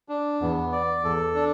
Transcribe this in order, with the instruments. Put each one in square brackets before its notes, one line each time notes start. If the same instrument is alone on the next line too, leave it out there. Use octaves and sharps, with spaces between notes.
[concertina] D4
[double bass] E2 [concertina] B3
[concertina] D5
[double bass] E2 [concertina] A4
[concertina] D4